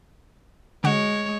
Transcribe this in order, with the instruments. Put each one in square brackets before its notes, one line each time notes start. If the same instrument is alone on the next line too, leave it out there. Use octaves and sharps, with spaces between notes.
[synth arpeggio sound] D3 F#4 [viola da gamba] G#3 C#5